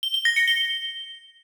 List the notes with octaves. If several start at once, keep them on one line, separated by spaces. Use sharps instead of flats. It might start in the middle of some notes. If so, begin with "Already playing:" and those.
G7
G7
A#6
C#7
G7